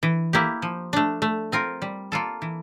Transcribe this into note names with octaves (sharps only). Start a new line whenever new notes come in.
E3
A#3 E4 G4
F3
A3 D4
A3
C4 F4 A#4
G3
A#3 F4 A4
E3